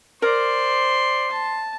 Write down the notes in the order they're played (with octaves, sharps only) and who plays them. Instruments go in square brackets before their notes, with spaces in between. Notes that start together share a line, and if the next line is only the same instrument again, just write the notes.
[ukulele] A#4 [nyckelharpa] C5 D5 [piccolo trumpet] C6
[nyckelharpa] A5